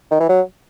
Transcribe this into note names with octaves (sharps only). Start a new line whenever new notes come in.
D#3
E3
F#3